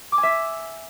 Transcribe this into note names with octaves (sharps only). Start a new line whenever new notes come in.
D6
G#5
E5